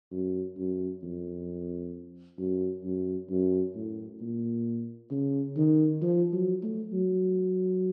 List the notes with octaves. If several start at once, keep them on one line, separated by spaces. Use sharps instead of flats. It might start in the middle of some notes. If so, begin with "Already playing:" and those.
F#2
F#2
F2
F#2
F#2
F#2
A2
A#2
C#3
D#3
F3
F#3
A3
F#3